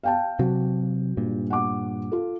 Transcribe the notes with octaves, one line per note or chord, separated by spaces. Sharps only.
F5 G5 A5
C3 F#3 F#4
G2 A#2
F#5 D6
F4 A4